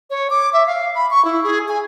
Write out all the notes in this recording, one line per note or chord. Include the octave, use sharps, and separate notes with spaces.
C#5
D6
E5
F5
B5
C#6
E4
G#4
G#5